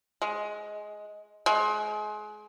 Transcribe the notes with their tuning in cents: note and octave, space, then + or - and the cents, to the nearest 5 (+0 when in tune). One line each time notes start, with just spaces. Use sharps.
G#3 +10
G#3 +30